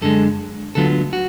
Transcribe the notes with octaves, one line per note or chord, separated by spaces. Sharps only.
F#2 D3 G#3 A4
D2 D3 F#3 B3 F4 A4
F#4